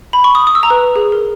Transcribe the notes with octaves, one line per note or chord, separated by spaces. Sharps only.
B5
C#6
D#6
D#6
E6
A#5
B4
G#4
A#4